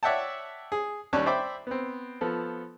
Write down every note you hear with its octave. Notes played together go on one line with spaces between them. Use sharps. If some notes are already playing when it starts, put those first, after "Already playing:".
C#5 D5 E5 F#5 G5 A5
G#4
D#2 G3 C#4 D4 A5 F#6
C5 D5 E5 G5 B5 D6
B3 C4
F3 B3 A4